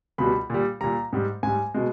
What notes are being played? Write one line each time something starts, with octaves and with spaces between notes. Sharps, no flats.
C#2 B2 G3 B5
A#2 G3
A#2 G3 A#5
G#2 G3
G#2 G3 G#5
B2 G#3